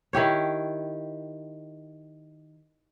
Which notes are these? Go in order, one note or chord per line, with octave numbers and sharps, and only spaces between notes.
D#3 E4 G4 C#5